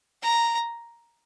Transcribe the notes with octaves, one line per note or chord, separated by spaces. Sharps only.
A#5